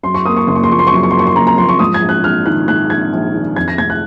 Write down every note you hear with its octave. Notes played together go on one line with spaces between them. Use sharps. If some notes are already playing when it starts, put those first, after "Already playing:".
F#2 C6
C#6
A#3 D#6
C#6
F#1 C6
C#6
C6
F3 C#6
C6
C#6
F#2 C6
C#6
A#3 C6
C#6
C6
F#1 A#5
A#5
F3 C6
C#6
G#2 D#6
G#6
A#1
F#6
A#1 F6
D#3 F#6
G#2 F#6
A#1 G#6
A#1
D#3
F2 G#6
A#6
F1 G#6
F#6